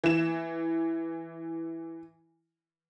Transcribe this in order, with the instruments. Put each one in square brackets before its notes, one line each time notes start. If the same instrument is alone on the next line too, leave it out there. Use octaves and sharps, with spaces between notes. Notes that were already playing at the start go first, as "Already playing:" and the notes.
[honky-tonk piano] E3 E7